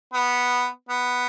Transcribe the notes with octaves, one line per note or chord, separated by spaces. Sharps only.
B3
B3